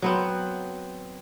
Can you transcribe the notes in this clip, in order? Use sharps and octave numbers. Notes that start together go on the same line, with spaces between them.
F#3 B3 C4